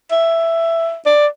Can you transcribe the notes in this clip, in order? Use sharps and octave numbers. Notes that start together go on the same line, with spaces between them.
E5
D5